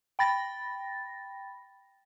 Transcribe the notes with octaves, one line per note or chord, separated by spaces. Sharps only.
G5 B5 A6 A#6